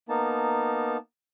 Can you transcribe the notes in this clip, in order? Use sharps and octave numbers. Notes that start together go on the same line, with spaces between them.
A#3 B3 D#4 A5